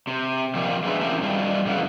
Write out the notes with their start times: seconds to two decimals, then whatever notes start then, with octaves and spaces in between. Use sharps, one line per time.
0.07 C3
0.55 A#2 D#3 F3 G3 A#3
0.84 G#3 B3 D4 B4 E5 A#5
1.01 C#3 E3 C4 G4 A#4 A5
1.21 G#2 G3 F4
1.65 F2 C#3 E3 F5 F#5